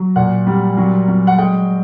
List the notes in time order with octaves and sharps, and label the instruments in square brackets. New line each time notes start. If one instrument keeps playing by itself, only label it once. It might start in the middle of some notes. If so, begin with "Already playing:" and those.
Already playing: [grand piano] F#3
A#2 F#5
G3
F#3
F#3
F#5
G#3 G5